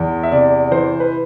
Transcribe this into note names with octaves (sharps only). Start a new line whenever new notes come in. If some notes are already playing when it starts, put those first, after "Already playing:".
Already playing: E2
E5
C3 D5
E3 C5
B4